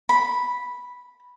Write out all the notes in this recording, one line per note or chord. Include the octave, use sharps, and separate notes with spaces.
B5